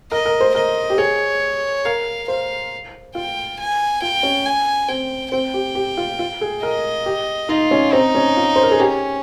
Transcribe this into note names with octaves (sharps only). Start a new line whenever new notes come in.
A#4 D#5
A#4
C5
A#4 D#5
G4
G#4 C#5
A#4 F5
C5 F5
F4 G5
G#5
F4 G5
C#4
G#5
C4 G5
C4 G5
G4
G4
F4
F4
G#4
A#4 D#5
G4
D#4 F4
C#4
C4 D#4
C#4
F4
C5
A#4
G#4
C#4 G4